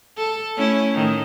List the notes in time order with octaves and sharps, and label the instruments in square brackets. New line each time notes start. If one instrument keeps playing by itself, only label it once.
[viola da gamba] A4
A3 C#4 E4
A2 D#3